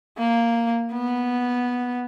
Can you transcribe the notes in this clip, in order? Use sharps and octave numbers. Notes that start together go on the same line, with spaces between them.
A#3
B3